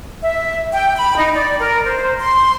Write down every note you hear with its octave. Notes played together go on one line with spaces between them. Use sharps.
E5
G5
B5
D#4
D5
A#4
C5
C6